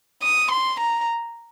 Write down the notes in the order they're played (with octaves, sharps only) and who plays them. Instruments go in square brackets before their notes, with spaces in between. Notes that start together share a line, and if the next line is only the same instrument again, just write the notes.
[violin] D#6
C6
A#5